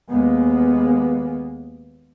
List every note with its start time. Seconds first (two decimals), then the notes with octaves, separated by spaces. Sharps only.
0.10 D#2 G#3 A#3 B3